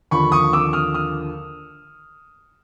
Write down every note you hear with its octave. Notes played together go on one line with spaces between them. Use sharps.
D#2 D3 F3 B5 C#6
C#6 D#6
D6 E6
D#6 F6
D#6 F6